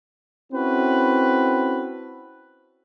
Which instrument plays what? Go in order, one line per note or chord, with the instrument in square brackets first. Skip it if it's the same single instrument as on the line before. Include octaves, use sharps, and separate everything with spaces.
[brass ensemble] C4 C#4 E4 F#4 A4 B4